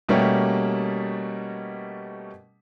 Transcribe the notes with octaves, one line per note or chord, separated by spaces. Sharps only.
B2 G3 A3 A#3 C#4 G4